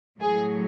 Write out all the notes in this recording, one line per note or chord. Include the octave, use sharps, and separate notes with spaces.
A2 F#3 G#4